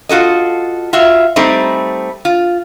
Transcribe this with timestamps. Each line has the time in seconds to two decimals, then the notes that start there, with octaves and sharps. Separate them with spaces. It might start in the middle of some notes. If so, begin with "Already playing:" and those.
0.09 F4 F#4 A4 D#5
0.93 F4 F#4 E5 F5
1.36 G3 A3 C4 D#4
2.25 F4